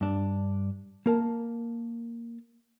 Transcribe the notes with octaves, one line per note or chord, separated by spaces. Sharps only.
G2 D4
A#3 A#4 A5